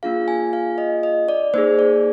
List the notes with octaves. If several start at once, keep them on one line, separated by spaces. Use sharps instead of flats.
A#3 D4 F4 G#4 F5
G#5
F5
D#5
D#5
D5
A#3 D#4 G#4 C5
D5